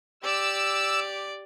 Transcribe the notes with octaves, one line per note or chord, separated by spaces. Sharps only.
G4 D5 E6